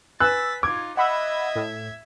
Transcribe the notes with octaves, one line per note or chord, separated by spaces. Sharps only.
B4 G#5 E6 F#6 A6 B6
D#4 F4 D6 G#6
D#5 E5 F#5 B5 E6 G#6
A2